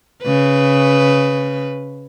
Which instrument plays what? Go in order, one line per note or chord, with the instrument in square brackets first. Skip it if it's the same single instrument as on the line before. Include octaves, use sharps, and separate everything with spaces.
[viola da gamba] C#3 B4